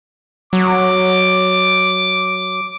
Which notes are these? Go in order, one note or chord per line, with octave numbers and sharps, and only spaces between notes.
F#3 D6